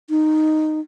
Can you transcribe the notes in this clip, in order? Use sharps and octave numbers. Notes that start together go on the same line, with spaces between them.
D#4